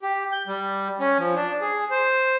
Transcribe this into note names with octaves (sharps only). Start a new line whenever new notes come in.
G4
G6
G3
C#4
F3
D4
G#4
C5